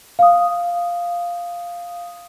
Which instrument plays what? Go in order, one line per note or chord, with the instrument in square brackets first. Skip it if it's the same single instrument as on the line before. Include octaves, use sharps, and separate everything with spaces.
[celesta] F5 D#6